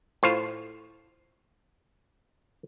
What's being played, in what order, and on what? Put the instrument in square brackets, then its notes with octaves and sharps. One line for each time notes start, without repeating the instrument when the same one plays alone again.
[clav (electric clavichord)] A2 F4 C5 F5